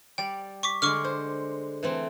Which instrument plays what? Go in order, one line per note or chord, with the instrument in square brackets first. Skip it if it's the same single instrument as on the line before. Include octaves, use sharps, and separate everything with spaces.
[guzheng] G3 D5 [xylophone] G5
[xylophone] C#6 D6 B6
[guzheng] D3 G#3 [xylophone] C#6 D6 F6
[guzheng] C5
E3 A3 C4